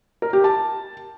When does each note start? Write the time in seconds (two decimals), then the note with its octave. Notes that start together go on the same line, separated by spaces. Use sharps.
0.22 A#4
0.33 G4
0.44 A5